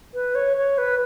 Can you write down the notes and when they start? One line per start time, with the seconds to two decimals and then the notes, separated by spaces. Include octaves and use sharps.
0.14 B4
0.35 C#5
0.57 C#5
0.78 B4